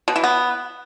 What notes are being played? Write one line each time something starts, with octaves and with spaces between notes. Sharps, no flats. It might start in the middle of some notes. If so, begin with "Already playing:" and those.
B2
E3
B3